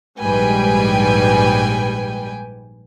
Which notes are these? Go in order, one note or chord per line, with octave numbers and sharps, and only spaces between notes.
A#1 G#2 G3 B4 G5 G#5